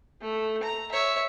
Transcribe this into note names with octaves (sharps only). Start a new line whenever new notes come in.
A3
A#5
C#5 E5